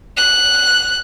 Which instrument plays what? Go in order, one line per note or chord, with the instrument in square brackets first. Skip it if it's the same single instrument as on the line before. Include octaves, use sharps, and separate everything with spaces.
[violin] F#6